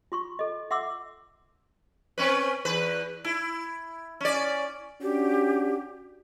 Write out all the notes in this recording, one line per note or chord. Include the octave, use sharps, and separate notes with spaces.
F4 C6 C#6
A4 D#5
E5 F#5 C6 D6 E6
C4 C#4 B4
E2 B4
E4
C#4 D5
C#4 D4 F#4 G4